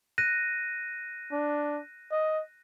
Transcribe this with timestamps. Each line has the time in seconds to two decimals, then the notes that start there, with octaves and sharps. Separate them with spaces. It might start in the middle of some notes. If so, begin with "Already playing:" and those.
0.18 F#6 A#6 D#7
1.32 D4
2.11 D#5